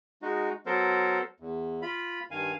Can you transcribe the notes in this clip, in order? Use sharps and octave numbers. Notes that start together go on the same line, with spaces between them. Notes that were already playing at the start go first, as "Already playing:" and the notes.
G#3 D#4 F#4
F#3 B3 A4 A#4 C5
E2
F4 B5
G2 D#3 F5 G#5